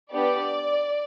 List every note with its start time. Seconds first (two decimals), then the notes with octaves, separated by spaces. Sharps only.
0.12 B3 D4 G4 D5